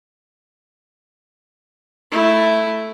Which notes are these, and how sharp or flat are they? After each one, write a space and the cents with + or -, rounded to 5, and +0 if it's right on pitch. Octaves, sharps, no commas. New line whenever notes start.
A3 +0 E4 +0